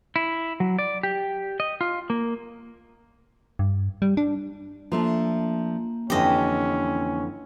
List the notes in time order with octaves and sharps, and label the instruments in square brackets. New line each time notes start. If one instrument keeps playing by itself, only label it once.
[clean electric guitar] E4
F#3
D5
G4
D#5
F4
A#3
[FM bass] G2
G3
D4
[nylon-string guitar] F3 A3 D4 [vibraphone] A#3
[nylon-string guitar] F2 D3 E3 [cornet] C#4 [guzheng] G4 D#5